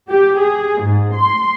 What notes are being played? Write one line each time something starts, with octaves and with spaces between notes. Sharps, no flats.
G4
G#4
G#2
C6